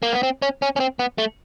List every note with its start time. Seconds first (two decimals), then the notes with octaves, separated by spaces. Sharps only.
0.03 A#3
0.13 B3
0.23 C4
0.42 C#4
0.62 C#4
0.76 C#4
0.80 C4
0.99 B3
1.18 A3